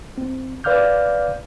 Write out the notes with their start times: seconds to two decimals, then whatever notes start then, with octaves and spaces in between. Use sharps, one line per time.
0.18 C4
0.64 B4 D5 F5 D6 F6 G6